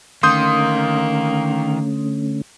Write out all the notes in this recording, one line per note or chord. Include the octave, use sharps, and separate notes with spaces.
D3 D#3 A3 A#3 C#4 C6 D#6 G6